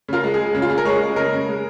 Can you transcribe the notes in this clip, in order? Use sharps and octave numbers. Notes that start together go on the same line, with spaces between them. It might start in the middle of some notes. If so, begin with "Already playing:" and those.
C#3 F4 A#4
G#3
G#4
G#3
C#3
F4
C#3 G#4
A#4
G#3 G#4 C#5
G#3
C#3 A#4 D#5
C#3
G#3